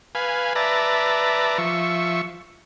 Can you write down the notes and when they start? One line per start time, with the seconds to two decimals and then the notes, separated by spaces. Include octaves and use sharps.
0.15 B4 F5 G#5
0.55 B4 D5 E5 A5 A#5
1.58 F3 E5 C#6